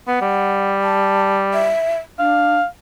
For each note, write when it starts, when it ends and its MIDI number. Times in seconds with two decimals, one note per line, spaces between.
0.07 0.20 59
0.07 0.72 78
0.22 1.72 55
0.83 1.37 81
1.54 1.97 76
2.19 2.56 62
2.19 2.65 77